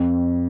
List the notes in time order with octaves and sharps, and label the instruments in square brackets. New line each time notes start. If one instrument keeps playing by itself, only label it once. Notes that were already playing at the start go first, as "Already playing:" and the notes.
Already playing: [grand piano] F2